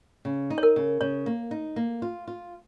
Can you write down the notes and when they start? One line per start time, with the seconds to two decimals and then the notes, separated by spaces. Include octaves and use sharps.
0.25 C#3
0.50 D#4
0.58 C#5
0.63 A#4
0.76 C#3
1.01 C#3 C#5
1.26 A#3
1.51 D#4
1.76 A#3
2.02 F4
2.28 F4